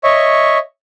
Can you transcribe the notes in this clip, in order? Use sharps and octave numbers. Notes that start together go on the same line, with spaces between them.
C#5 D#5 E5 C#6